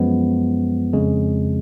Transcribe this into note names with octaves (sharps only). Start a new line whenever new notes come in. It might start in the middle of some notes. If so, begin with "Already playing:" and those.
Already playing: F#2 F3 G#3 B3
F2 C#3 G#3